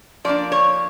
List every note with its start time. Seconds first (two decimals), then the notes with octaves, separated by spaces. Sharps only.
0.25 F3 A#3 D4 D5
0.52 C#5